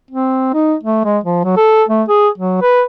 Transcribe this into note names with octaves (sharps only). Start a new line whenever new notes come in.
C4
D#4
A3
G#3
F3
F#3
A4
A3
G#4
F#3
B4